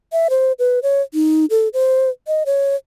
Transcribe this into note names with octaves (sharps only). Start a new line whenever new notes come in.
E5
C5
B4
C#5
D#4
A4
C5
D#5
C#5